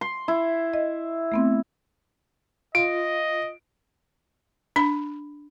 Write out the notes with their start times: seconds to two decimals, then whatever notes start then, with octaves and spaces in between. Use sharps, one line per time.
0.01 C6
0.28 E4
0.74 D#5
1.32 A3 B3 C4
2.75 F4 D#5 D7
4.76 D4 B5